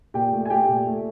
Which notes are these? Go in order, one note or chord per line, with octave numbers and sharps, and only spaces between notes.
A#2 G4 G5
A3
G#5
A3 G4 G5
A#2
A3